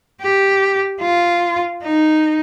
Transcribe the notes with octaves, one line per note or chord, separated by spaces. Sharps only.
G4
F4
D#4